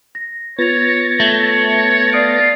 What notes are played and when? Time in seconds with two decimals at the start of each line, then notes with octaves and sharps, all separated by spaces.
0.15 A#6
0.59 B3 F4 C#5 A6 A#6 F7
1.20 A3 C#5
2.13 F4 D5 D#6 D7